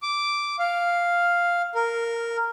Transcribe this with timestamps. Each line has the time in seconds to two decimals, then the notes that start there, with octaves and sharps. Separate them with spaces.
0.02 D6
0.59 F5
1.75 A#4